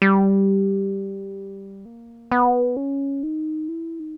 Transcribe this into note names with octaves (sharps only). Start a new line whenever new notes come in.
G3
A#3
B3
C#4
D#4
E4
D#4